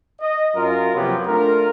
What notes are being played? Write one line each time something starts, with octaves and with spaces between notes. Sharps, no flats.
D#5
F#2 F4 A#4
C3 F3 F#3 A#3 B3 G4
A3 D4 F4 A#4